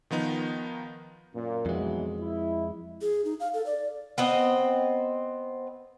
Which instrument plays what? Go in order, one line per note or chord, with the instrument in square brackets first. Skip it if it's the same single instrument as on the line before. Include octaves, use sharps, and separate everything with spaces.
[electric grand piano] D#3 F3 B3 D#4
[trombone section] F#2 A#2
[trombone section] B1 E3 F#3 [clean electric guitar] F2 G#3
[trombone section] E4
[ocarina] G#4
D#4
F5
A4
D5
[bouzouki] B3 C4 D#5